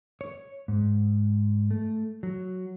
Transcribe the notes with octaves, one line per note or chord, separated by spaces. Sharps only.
C#5
G#2
A3
F#3